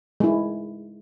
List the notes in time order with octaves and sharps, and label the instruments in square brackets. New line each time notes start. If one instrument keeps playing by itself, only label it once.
[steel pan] G#3 E4